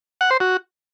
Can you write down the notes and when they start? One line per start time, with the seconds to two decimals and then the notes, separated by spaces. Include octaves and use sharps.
0.21 F#5
0.31 C5
0.40 F#4